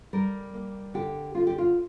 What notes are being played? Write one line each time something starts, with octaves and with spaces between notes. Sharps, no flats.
G3 A#4
A#3
D3 G4
D3 F4
G4
F4